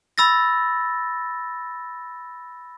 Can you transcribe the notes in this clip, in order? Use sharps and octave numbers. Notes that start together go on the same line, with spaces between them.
B5 E6 A6 A#6